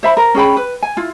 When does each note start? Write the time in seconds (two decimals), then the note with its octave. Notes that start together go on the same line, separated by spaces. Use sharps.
0.03 C5 E5 B5
0.17 A#4
0.35 C#4 G#4 G5 B5
0.57 B4
0.83 G#5
0.97 E4 F4